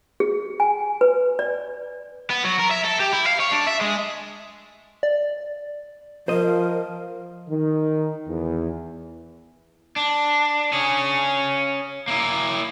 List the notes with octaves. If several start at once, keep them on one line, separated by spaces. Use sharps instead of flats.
G#4
G#5
B4
D5
B3
F#3
A#4
E5
A4
G4
E4
F5
C#5
D4
E5
G#3
D5
F3 A#4 C5 D#5
D#3
E2
D4
C#4 G#4
A#3 E4